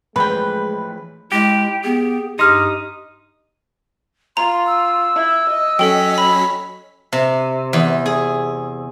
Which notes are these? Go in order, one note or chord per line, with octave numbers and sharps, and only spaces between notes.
A2 E3 F3 G#3 B4 G5 B5
G#3 E4 G4
B3 G#4
G2 D#4 G4 C6 D#6 F6
F4 A#5 C6
E6
E4
D#5
F#3 C#4 A4 G5 B6
B5
C3
E2
G#4